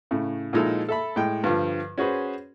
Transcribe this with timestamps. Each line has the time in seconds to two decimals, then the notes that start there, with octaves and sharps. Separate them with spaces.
0.11 A2 C#3
0.53 A#2 F3 G#3 D#4 E4 A4
0.89 A4 E5 B5
1.16 A2 G#3 G5
1.44 G2 D3 F3
1.98 C#4 F#4 G#4 B4 C5